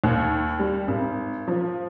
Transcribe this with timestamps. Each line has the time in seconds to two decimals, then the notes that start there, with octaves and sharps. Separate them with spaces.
0.04 D#2
0.59 G3
0.88 G#1
1.48 F3